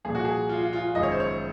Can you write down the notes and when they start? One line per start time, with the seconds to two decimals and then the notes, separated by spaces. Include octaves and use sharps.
0.04 C2 A#2 F3 G#4
0.15 F#4
0.25 G#4
0.49 F4
0.61 F4
0.73 F4
0.84 F4
0.95 F#1 F#2 D#3 G#3 D#5
1.03 C#5
1.12 C5
1.20 C#5